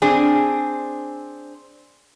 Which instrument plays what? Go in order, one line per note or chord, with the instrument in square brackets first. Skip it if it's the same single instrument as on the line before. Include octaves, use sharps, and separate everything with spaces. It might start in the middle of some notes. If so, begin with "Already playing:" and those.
[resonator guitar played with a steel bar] C4 D4 G#4